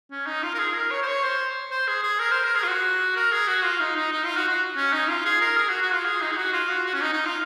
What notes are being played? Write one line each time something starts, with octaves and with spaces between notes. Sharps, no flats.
C#4
D#4
F4
A#4
G#4
A#4
C#5
C5
C#5
C5
C5
G#4
G#4
A#4
C5
A#4
G#4
F4
F#4
A#4
G#4
F#4
F4
D#4
D#4
D#4
F4
F#4
F#4
C#4
D#4
F4
G#4
A#4
G#4
F#4
F#4
F4
G#4
D#4
G#4
F#4
F4
F#4
F#4
C#4
D#4
D#4
F4